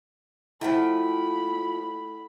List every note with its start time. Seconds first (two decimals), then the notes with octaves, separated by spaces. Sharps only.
0.61 F3 A3 E4 F4 F#5 G5 B5